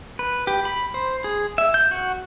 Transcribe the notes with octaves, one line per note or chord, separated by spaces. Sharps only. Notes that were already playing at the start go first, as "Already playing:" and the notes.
B4
G4
B5
C5
G#4
E5
G6
F#4